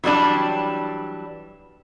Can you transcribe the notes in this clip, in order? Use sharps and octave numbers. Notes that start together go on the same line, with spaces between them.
E3 F#3 G3 D4